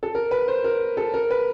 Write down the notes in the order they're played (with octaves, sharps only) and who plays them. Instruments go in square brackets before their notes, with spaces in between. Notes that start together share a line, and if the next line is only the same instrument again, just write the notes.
[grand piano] A4
A#4
B4
C5
A#4
A4
A#4
B4